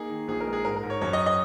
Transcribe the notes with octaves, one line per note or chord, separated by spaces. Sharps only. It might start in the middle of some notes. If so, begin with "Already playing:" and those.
Already playing: A#3 D#4 G#4
D#3
A#1 G#4
A#4
G#3
G#4
G#2 A#4
A#4
G#2
C#5
F#2 C#5
D#5
D#5